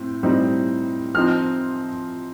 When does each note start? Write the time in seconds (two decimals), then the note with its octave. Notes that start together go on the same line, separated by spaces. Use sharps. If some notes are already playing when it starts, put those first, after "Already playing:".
Already playing: A2 C4
0.23 A2 G3 C4 D#4
1.14 F3 C4 D#4 F6